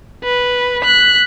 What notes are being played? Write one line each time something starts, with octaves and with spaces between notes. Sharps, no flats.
B4
F#6 B6